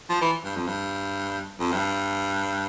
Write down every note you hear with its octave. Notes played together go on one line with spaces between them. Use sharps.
F3
E3
G2
F2
G2
F2
G2